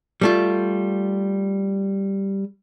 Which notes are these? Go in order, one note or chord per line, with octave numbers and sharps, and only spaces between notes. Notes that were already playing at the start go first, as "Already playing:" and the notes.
G3 A3 F4